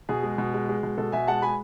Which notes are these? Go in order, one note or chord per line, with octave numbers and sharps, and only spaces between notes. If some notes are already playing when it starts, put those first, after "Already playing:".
B2 G#4
G#3
B2
G#3
G#3
B2
B2 A4
B2 E5 G#5
G#3 F#5 A5
G#3 G#5 B5